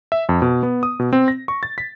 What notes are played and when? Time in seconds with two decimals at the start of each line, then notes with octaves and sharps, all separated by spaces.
0.12 E5
0.29 F2
0.42 B2
0.63 B3
0.83 D#6
1.00 B2
1.13 C4
1.28 A#6
1.48 C#6
1.63 A6
1.78 B6